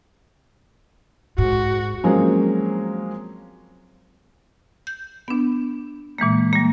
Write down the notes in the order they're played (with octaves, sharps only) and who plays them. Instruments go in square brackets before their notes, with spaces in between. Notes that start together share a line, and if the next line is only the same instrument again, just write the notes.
[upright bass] G#2 [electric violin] F#4
[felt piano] F3 F#3 G#3 A#3 C4 C#4
[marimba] G6
B3 D4
A#2 E3 G#3 A#3
G3 A#3